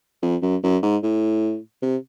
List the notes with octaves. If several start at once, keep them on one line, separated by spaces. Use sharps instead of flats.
F2
F#2
F#2
G#2
A2
C3